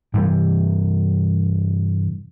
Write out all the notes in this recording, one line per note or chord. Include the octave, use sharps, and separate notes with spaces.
G2 C3 E3 G3